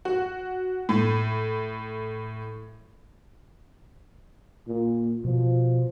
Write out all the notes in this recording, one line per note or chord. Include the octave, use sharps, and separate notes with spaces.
F#4
A2
A#2
B2 F3